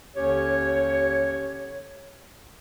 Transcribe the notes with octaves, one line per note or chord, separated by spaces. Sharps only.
D#2 D3 C#4 G4 C#5